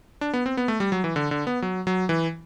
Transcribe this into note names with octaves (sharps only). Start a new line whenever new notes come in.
D4
B3
C4
B3
A3
G3
F#3
E3
D3
D3
B3
F#3
F#3
E3